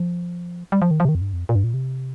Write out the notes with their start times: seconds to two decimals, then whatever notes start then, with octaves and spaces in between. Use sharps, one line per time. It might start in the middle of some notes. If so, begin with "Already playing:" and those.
Already playing: F3
0.72 G3
0.82 F3
0.91 D#3
1.00 F3
1.05 C3
1.09 D#3
1.15 F2
1.21 G2
1.33 F2
1.49 A#2
1.55 G2
1.64 A#2
1.74 C3